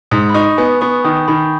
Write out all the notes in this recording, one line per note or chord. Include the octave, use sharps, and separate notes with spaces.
G#2 D#6
B5
D#4 C#6
B3 G#5
B3 C#6
D#3 D#6
D#3 B5